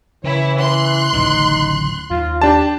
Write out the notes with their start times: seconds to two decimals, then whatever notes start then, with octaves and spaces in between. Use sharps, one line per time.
0.24 C#3 E3 E4 C#5
0.60 C6 F#6
1.13 D1 A1 C#3 D#4
2.10 D#2 F4
2.42 D4 G4 A5